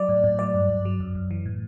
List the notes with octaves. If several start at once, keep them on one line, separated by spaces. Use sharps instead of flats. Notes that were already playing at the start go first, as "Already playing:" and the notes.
Already playing: F#3 D5
A2
A2
F#3 D5
G2
G2
F#3
F#2
F#2
E3
A2